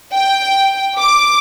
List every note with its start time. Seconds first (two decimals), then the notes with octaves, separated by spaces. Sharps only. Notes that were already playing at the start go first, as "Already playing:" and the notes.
0.13 G5
0.98 D6